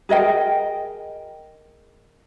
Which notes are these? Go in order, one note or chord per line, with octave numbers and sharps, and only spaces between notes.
G#4 A#4 D#5 G5